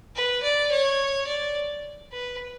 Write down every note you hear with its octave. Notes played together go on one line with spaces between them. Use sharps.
B4
D5
C#5
D5
B4